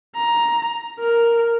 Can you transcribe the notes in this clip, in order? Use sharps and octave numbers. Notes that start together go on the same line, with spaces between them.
A#5
A#4